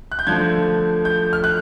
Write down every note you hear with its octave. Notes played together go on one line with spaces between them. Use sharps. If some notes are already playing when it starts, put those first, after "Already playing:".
F#6
G6
D3 F3 A3 G#6
G6
F6
F#6